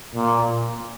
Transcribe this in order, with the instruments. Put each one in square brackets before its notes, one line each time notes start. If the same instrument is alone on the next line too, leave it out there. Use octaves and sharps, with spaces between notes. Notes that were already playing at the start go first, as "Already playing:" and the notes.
[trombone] A#2